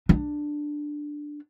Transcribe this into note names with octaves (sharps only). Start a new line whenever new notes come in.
D4